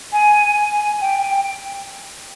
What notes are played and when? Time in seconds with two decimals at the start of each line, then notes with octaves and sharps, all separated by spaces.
0.13 G#5
0.71 G#5
1.01 G5
1.30 G5